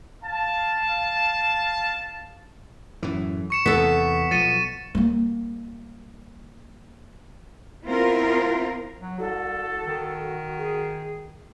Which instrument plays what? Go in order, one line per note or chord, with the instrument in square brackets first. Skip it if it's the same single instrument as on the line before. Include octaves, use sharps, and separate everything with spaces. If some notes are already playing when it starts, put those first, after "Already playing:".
[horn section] F5 A5
[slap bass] F#2 A2 E3
[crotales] C#6 C#7 E7
[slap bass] E2 C3 [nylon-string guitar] B3 A4 [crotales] B6
[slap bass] B1 F3 [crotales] A6 C#7 D#7
[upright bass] G3 A#3
[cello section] B3 C4 E4 F4 A#4 C5
[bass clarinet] F#3
[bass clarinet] C2 [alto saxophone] F#4 [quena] A4
[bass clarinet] D#3
[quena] G#4